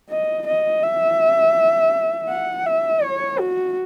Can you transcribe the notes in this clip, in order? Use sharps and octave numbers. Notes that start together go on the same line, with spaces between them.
D#5
D#5
E5
F#5
E5
C#5
F#4